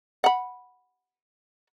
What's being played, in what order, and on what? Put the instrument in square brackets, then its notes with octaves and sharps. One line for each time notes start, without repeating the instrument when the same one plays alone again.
[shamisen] F#5 B5